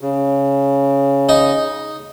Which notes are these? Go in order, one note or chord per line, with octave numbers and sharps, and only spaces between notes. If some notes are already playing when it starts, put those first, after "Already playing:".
C#3
D#4